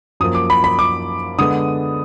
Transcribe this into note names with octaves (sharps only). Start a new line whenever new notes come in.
F#2 F3 A#3 D#6
D6
B5
B5
D6
D3 G#3 B3 D#6